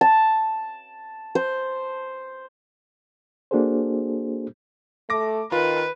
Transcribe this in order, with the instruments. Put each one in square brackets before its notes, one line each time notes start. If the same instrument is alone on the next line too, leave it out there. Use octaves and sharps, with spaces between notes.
[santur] A5
C5
[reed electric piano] A#3 D4 F#4 G#4 A4 C5
[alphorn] A3 [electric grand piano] D6 A#6
[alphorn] D#3 [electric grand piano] F4 [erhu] B4